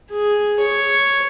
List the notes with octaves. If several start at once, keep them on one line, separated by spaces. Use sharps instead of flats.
G#4
C#5